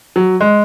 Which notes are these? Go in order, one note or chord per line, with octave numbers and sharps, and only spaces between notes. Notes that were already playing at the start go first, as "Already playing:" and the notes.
F#3
G#3